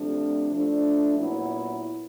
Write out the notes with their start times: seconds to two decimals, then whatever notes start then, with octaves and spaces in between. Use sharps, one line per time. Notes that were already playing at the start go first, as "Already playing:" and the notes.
Already playing: C3 F3 A3 D4
0.52 F3 A3 D4
1.16 A#2 F#3 B3 E4